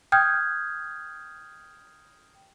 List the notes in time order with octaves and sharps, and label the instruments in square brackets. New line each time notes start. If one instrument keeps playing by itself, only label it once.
[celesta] G5 D#6 F6 G6 G#6